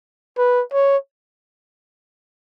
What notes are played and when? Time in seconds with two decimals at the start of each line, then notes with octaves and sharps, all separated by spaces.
0.39 B4
0.73 C#5